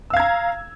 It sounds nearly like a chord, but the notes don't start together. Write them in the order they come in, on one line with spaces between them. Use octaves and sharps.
E6 F5 G#6 A#5